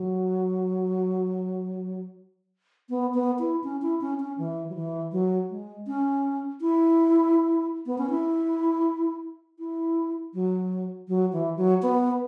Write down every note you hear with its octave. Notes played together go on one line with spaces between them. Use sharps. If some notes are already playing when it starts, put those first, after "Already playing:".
Already playing: F#3
B3
B3
E4
C#4
E4
C#4
C#4
E3
F#3
E3
F#3
G#3
C#4
E4
B3
C#4
E4
E4
F#3
F#3
E3
F#3
B3